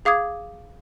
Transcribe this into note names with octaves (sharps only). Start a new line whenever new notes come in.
G#4 F5 D6 D#6 G#6